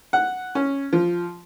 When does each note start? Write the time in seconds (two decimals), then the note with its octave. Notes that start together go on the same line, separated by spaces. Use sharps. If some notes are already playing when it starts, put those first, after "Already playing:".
0.13 F#5
0.55 C#4
0.93 F3